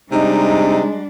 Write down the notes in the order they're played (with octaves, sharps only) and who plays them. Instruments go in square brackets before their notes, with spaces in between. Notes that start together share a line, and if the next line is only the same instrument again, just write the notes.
[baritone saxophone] C3 [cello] G3 D4 [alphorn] G#3 [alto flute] D#4